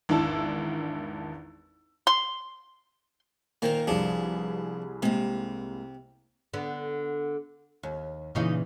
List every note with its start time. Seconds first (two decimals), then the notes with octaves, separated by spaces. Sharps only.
0.09 G#1 E2 D4 E4 A5 E6
2.07 C6
3.62 A#2 D#3 A#4 C5 F5
3.87 C2 F3 B3 D4 G#4
5.02 C3 G#3 A#3
6.53 D3 B3
7.83 D#2
8.35 A#2 C#3 E3 C#4 D#4 F5